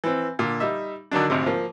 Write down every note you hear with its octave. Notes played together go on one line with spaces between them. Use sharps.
E3 C4
A#2 D3
G3 D#4 E5
D3 D#3 F#3 D4
G#1 D2 C3
F3 A#3